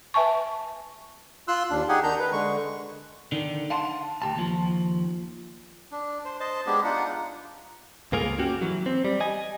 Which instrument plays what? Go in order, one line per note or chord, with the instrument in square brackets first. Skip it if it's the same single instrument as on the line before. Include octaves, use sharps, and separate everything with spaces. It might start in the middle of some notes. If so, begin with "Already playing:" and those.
[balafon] B4 E5 G#5 A5 C#6
[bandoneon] F4 C6 E6 F#6
D#2 D4
D#4 G4 G#4 F#5 G#5
D#3 D4 A#5 G6
B4
D3 G#3 C#6
[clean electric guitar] D3 D#3
F5 F#5 A5 C6
D2 G4 A5
D#2 F3
[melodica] D4
C5
C5 D#5 A5
G#3 B3 D4 G4
D4 D#4 F4 F#5
[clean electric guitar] C#2 G2 A#3 F4 G#4 A#4
A#3 C#4 F#4 G4
E3 F#3
C4
G3
D#5 G#5